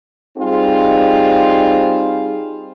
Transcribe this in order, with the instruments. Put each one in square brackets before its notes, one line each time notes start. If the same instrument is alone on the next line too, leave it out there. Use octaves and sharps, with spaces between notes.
[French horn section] G3 C4 D#4 F4 G#4